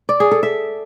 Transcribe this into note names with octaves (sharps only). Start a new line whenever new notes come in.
D5
G#4
A4
E5